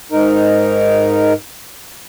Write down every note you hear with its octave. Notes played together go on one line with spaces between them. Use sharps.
G#2 D#4 A#4